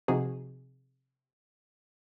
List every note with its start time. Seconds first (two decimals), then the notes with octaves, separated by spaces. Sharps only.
0.08 C3 F3 D#4 F#4 G#4